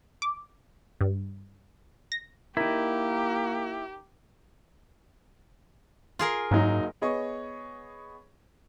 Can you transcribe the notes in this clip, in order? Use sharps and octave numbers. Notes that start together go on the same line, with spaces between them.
D6
G2
A#6
A#3 D#4 E4 G4 A#4
F4 G#4 A#4
F#1 G#2 F#3 D#4
B3 G#4 C#5 D#5 C#6